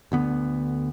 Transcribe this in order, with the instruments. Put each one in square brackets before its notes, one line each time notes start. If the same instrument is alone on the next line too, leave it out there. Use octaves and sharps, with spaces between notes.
[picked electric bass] D2 D3 B3